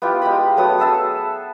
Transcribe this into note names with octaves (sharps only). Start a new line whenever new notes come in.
B3 E4 F4 G4
G#3 G4 A#5 B5
F#3 A3 B3 D#6
G#4 A4 E5 A5